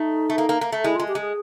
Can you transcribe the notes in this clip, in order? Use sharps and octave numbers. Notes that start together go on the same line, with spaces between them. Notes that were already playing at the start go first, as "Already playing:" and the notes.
Already playing: A3 D#4
A3
A#3
A#3
A#3
A3
G#3 E4
F4
G#3
G4
G#3 G#4